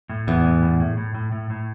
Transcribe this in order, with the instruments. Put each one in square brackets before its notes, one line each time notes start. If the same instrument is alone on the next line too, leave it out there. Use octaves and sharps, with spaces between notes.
[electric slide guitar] A2
[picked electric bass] E2 [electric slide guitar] B3
[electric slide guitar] A2
A2
A2
A2
A2
A2
A2